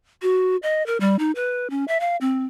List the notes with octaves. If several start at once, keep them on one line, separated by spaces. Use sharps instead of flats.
F#4
D#5
A#4
G3
D#4
B4
C#4
E5
F5
C4